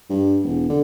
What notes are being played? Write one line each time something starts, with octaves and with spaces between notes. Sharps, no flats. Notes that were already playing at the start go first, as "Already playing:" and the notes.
G2
E1
D3